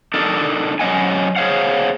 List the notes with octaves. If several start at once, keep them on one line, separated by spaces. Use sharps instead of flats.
D4 D#4 A4 A#4
F#3 C#4 G4 D#5 F#5 G#5
G#4 C5 C#5 F5 F#5